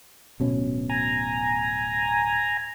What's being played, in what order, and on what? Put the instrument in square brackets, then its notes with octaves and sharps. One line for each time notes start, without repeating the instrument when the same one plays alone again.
[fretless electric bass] D1 B2 C#4
[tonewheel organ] G#5 A#5